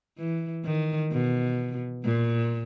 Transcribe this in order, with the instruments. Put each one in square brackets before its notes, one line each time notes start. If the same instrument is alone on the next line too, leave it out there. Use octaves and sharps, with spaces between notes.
[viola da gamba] E3
D#3
B2
A#2